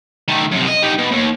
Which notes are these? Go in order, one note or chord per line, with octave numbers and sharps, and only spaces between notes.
D#3 A3
F#2 C3
D#5
G3 D#4
B2
D#2